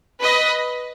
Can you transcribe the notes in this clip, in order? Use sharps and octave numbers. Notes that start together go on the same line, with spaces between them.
B4 D#5